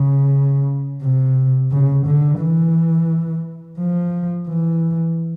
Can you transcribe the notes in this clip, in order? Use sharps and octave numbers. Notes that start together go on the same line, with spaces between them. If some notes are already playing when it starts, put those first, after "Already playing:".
Already playing: C#3
C3
C#3
D3
E3
F3
E3